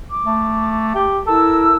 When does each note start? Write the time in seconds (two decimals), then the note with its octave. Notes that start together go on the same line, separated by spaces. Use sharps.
0.09 D6
0.26 A3
0.95 G4
1.27 E4 A4 A#4 E6